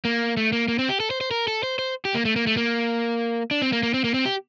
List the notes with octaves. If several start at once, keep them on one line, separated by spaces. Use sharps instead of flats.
A#3
A3
A#3
A#3
C4
G4
A4
C5
C5
A#4
A4
C5
C5
G4
A#3
A3
A#3
A3
A#3
D4
C4
A#3
A#3
C4
A#3
C4
G4